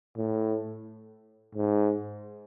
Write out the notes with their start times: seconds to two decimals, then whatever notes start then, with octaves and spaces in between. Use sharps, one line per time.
0.17 A2
1.55 G#2